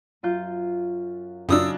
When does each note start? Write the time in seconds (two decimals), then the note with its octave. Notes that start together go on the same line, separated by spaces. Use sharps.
0.23 F#2 F4 G6
1.49 F#2 C#3 F#3 D4 D#4 F4 D#6 E6